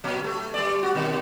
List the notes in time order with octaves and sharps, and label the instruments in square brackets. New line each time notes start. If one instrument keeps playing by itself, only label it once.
[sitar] G2 A#2 F#3
A3
G3 A3 D5
F#4
B2 D#3 G3